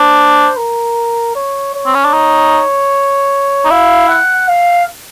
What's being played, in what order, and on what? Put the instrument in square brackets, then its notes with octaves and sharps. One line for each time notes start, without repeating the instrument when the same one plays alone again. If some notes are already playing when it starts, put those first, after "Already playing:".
Already playing: [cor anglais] D4 [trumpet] C5
[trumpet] A#4
C#5
C#5
[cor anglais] C4
C#4
D4
D#4
D#4
[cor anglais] E4 [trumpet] F5
[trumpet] F#5
F5